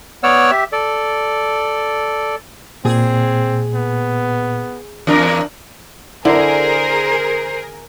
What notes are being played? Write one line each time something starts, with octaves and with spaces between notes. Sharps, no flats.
B3 C#5 D5 F#5 E6 F6
G4 E5
A4 D5
A#2 C4 G#4
B3
E2 D4 A#4
D3 E4 G#4 A#4 C5